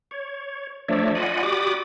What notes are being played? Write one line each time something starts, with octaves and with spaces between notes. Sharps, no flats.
C#5
F3 A3 D4 C#5 D5 E5
F4 D5 D#5 F#5 G#5 B5
F#4 G4 D5 B5 D6 D#6